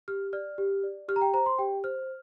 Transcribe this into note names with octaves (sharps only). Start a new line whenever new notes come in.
G4 F6
D5 F6
G4
D5
G4 F6
A#5
G5
C5 A#5
C6
G4 G5
C5 F6